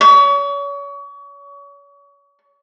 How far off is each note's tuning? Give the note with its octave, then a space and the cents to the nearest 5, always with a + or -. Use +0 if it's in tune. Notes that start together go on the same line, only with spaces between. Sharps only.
C#5 +35